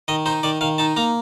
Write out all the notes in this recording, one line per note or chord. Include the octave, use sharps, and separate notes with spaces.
D#3 D#5
D#4 C5
D#3 D5
D#3 F5
D#4 A5
A#3 A#5